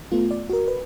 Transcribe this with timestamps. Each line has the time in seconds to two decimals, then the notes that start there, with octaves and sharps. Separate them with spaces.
0.12 A3 B3 F4
0.31 D5
0.49 F#4 A#4
0.68 B4